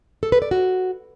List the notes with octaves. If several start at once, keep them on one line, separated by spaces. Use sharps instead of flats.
A4
B4
D5
F#4